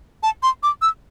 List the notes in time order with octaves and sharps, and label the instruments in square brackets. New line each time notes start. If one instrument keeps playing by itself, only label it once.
[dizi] A5
C6
D6
E6